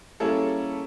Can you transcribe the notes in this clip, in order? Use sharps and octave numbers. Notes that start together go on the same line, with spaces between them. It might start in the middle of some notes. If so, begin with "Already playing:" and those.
G3 A#3 C#4 E4 G#4 A4